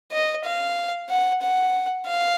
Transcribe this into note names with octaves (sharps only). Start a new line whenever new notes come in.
D#5
F5
F#5
F#5
F5